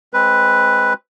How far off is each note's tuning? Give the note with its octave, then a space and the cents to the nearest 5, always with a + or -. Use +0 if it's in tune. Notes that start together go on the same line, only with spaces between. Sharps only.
G#3 +0 C4 +20 B4 +0